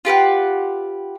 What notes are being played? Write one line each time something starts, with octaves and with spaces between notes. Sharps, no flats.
F4 G4 B4 F#5